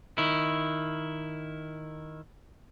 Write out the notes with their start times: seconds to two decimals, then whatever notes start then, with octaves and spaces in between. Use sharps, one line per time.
0.18 D#3 E4